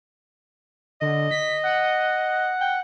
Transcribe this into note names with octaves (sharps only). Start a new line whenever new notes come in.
D3 D#5
B6
F#5
G5